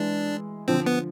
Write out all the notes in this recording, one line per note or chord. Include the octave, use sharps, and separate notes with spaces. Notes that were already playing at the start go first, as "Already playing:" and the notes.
Already playing: E3 G#3 D4
D3 F3 C4
B3